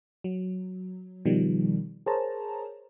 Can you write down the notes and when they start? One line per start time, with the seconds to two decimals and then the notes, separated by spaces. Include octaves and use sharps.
0.24 F#3
1.25 B2 D#3 F3 G3
2.06 G#4 A#4 C5 C#5 A5 A#5